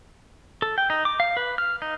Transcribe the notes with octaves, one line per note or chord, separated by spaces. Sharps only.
A4
G5
D#4
D6
F5
B4
F6
D#4